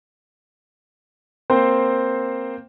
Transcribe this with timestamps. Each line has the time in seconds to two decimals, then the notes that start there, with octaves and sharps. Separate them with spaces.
1.50 A#3 C4 C5